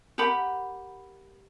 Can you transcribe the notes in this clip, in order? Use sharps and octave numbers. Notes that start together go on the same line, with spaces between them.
G4 A#4 F#5 B5